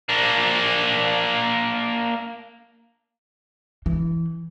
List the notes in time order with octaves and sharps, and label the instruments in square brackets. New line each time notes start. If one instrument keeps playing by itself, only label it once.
[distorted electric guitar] A#3 D4
[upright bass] E3